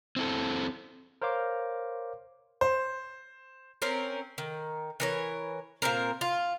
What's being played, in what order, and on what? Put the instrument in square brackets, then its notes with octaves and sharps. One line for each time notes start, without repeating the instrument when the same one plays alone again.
[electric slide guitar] C4 E4 A4
[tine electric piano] A#4 C5 C#5 F5 D6
[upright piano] C5
[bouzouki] C4 C#4 A#4
D#3
E3 A#4 C#5
A#2 D3 C4 A#4
F4